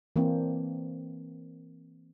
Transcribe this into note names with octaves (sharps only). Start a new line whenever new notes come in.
E3 A#3 C4 D4